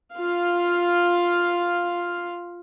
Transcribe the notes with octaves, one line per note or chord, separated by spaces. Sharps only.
F4 F5